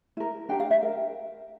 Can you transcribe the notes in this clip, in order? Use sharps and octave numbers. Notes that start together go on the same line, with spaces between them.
E4 A#4
D4 G4 A#4 G5
F5
E5
A#4